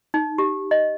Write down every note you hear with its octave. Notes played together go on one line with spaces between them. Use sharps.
D#4
G4
D#5